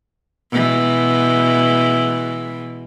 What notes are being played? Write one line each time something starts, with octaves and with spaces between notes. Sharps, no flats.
B2 E3 G#3